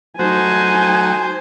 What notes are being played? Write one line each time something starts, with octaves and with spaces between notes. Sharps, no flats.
F#3 A3 D#4 F#4 C5 G#5